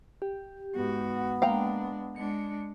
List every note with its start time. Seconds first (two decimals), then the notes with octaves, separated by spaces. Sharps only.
0.22 G4
0.75 G#2 B3 F#4
1.42 G#3 A#3 D4 F5 G5 A#5
2.16 G#3 D4 C#7